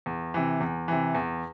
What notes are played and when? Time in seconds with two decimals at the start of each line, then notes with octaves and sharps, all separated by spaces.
0.06 E2
0.34 C3 E3
0.60 E2
0.88 C3 E3
1.15 E2